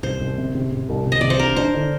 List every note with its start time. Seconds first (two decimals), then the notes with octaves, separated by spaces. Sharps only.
0.03 C2 C5
0.21 C2
0.38 C3
0.55 C3
0.72 C3
0.89 C2
1.06 C2
1.12 D#5
1.21 C3 D5
1.30 C5
1.39 D4 A#4
1.56 D4 C5
1.74 D3